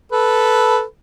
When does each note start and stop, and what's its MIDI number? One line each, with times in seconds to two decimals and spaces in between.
0.12 0.83 69
0.12 0.83 71